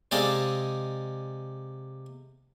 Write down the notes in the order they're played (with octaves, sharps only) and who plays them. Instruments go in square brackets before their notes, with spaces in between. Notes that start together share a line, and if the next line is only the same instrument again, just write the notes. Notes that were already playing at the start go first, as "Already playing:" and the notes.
[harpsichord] C3 G#3 A4 D5 D#5 F5